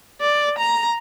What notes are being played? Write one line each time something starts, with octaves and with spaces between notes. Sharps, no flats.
D5
A#5